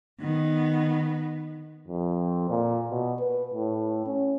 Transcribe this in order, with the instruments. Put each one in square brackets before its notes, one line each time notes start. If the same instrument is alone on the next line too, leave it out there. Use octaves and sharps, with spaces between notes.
[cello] D#3 B3
[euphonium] F2
A#2
B2
B4
A2
C#4